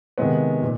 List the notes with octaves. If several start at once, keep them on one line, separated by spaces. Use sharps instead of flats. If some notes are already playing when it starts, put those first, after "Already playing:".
C3 D#3 G#3 B3
A#2